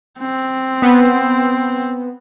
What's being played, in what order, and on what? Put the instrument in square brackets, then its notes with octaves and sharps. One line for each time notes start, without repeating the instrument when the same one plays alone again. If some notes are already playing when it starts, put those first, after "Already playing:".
[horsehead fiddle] C4
[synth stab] B3